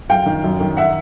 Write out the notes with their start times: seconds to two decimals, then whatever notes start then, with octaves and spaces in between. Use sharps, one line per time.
0.09 F#2 F5 G5
0.26 D#3
0.44 F#2
0.60 D#3
0.77 E5 F#5